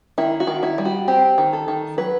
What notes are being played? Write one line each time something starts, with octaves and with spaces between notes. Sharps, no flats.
D#3 E4
F#4
D#3
E4
G3
F#4
C4 G4
D#3
A4
D#3
F#3 B4